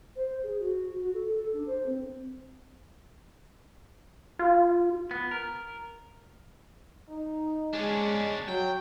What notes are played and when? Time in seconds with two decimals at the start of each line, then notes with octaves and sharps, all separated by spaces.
0.16 C5
0.43 G#4
0.60 F#4
0.99 F#4
1.14 A4
1.32 A4
1.53 D4
1.67 C5
1.86 C4
4.39 F4
5.11 B3
5.31 A#4
7.09 D#4
7.74 G#3 C#4 D4
8.48 F#3 G5